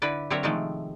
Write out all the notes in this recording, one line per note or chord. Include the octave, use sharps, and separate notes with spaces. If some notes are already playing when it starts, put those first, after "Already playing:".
D3 E4 B4 D5
D3 F#3 C4 A#4 C#5 E5
C3 D#3 F3 G#3 A3